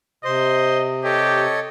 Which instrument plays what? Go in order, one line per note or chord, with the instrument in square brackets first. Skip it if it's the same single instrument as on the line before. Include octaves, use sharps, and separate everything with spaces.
[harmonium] C3 [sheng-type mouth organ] C5 C6 [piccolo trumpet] D#5
[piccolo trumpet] G4 [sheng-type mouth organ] A4 C#5 D#5